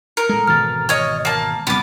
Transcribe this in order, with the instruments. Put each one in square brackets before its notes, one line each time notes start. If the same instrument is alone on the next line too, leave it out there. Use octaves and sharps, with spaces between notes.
[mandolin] A#4 [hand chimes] C#7
[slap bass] A2 G#3 [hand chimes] A4
[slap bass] G#1 B2 E3 [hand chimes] F6 A6
[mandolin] C#5 D#5
A#3 A5
[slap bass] C2 F2 B2 [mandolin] B3 D6